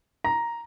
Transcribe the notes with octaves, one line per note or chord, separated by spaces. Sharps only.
A#5